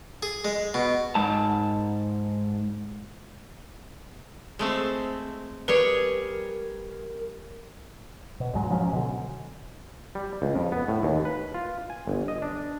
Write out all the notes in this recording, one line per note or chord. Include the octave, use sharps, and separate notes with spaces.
G#4
G#3
B2
G#2 A5
G#3 A3 C4
G3 G#4 A#4 B4 C#5
B2
C#2 G#2 F#3 G#3
F3 F#3 G#3 C#4
B2 D3
G3
C#2
F2
B3
A2
D#2
B4
F4
G#5
G1
D#5
D4